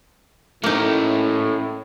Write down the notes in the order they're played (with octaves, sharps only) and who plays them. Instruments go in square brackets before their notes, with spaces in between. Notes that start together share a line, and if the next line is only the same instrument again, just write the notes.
[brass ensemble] A2 [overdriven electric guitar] A3 C#4 [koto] A#3 D#4